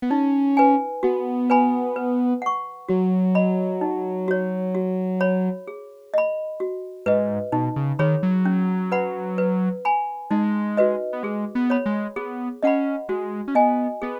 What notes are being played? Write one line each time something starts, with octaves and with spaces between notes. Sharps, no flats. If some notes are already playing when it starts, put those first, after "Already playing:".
B3
C#4 D#4
B4 G#5
B3 F#4
B4 G#5 B5
B4
F#5 C#6
F#3 F#4
D#5 B5
D#4
F#4 C#5
F#4
C#5 B5
G#4
D#5 B5
F#4
G#2 B4 D#5
B2 D#4
C#3
D#3 G#4 C#5 B5
F#3
C#4
B4 F#5 B5
B4
G#5 B5
G#3 D#4
F#4 B4 D#5
B3
G#3 G#4
B3
C#5 B5
G#3
B3 G#4
C#4 D#5 F#5 B5
G#3 F#4
C#4
B3 D#5 G#5
B3 G#4